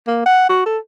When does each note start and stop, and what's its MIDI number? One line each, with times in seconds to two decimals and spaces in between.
0.07 0.24 58
0.26 0.48 78
0.50 0.63 66
0.66 0.78 69